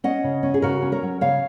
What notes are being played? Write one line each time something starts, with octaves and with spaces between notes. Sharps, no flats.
C#4 D#5 F#5
C#3
C#4
G#4
C#3 F#4 A#4
C#4
A#4 C#5
F#3
C#3 C#5 F5